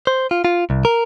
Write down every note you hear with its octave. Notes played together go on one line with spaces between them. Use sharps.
C5
F4
F4
C2
A#4